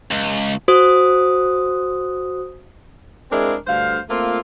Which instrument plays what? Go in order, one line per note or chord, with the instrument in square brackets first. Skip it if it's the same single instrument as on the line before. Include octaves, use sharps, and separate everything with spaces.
[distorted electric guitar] C#2
[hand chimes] F#4 C5 D#6
[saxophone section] G#3 C4 D4 E4 G#4 A#4
D2 G2 D3 C5 F5
A3 A#3 C4 F4